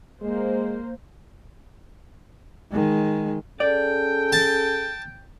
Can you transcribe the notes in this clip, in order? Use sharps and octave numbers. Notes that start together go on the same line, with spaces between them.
G#3 A#3 C5
D#3 G#3
C#4 G#4 A4 D5 G5
A5